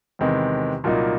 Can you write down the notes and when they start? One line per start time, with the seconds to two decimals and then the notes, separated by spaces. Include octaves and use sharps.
0.19 E2 C3 D#3 G#3 B3
0.84 C2 A#2 F#3 A#3 D#4